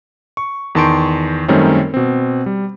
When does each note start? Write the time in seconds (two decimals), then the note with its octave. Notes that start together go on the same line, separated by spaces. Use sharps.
0.37 C#6
0.75 E2 D#3 A5 C6 C#6 D7
1.48 F#2 D#3 G3 A3 C4 C#4
1.94 B2 C4
2.46 G3